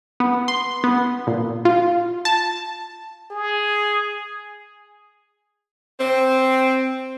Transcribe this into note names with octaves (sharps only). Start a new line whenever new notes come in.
B3
C6
B3
A#2
F4
A5
G#4
C4